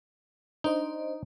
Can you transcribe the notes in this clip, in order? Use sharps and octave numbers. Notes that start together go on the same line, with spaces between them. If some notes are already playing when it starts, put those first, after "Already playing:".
D4 D#4 C5 D#5